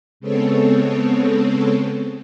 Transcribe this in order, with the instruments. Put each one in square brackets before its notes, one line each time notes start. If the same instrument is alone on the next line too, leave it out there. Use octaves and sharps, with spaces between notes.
[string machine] C#3 G#3 B3 C4 A4 C#5